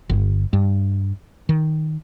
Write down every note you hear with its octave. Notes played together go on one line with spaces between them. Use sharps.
G1
G2
D#3